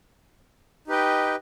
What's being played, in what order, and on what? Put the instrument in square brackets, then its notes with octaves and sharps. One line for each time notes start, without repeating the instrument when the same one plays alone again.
[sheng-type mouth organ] D#4 G4 B4 D#5 G5